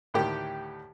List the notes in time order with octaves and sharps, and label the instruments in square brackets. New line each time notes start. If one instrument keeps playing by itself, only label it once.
[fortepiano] D2 A2 D#3 G4